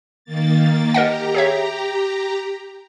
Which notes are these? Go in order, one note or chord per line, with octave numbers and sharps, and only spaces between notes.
D#3 A#3 A6
G4 A#4 D#5 F#5 A#5
G#4 C#5 E5